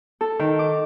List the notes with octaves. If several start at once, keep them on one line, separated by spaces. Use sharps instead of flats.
A4
D#3
D6